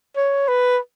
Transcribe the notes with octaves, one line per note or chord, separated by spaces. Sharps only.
C#5
B4